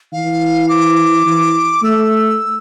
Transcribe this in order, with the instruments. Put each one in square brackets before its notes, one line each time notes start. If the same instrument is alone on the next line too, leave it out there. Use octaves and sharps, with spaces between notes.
[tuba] E3 [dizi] F5
[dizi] D6
[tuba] E3
[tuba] A3 [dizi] E6